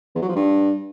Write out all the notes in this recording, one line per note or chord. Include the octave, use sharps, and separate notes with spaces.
E2
F#3
F3
G2